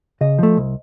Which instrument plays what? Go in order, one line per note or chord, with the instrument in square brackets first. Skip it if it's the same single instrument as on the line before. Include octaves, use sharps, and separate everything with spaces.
[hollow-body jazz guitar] C#3 D#5
F3 A3
C2